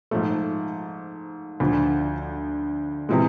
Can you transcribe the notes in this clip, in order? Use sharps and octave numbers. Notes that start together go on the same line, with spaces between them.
G#2 F3 A3
D2 D3 F3
C3 E3 G#3